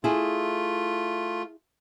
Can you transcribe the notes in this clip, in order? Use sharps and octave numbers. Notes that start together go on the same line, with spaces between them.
A3 E4 F4 G#4